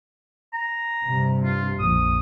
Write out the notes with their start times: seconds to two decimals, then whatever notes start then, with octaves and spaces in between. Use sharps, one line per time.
0.53 A#5
1.05 G2 C3 G3
1.44 F4
1.79 A#1 F2 F3 D#6